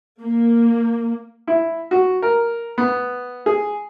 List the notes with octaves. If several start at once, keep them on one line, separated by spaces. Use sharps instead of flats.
A#3
E4
F#4
A#4
B3
G#4